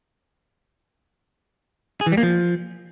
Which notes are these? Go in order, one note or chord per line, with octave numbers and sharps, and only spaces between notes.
G#4
E3
G3
A#3
F3